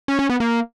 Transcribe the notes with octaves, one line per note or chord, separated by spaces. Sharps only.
C#4
C#4
B3
A#3